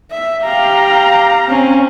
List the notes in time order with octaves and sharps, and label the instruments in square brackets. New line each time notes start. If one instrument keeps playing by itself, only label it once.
[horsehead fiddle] E5
[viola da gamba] G4 [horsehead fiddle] F5 A#5
[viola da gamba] C4 C#4